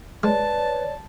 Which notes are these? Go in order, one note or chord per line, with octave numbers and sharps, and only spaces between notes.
G#3 B4 C#5 D5 A5